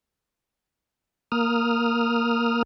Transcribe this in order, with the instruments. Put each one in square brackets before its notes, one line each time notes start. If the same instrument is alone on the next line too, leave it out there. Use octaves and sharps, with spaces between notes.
[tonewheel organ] A#3 D#6 F6